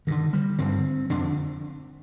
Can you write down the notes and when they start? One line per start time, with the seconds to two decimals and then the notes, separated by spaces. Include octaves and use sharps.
0.07 G2 D3 D#3
0.33 G3
0.58 G2 D3 C4
1.10 F2 D3 D4